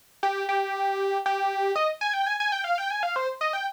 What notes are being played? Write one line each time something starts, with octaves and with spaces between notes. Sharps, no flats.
G4
G4
G4
D#5
G#5
G5
G#5
G#5
G5
F5
G5
G#5
F5
C5
D#5
G5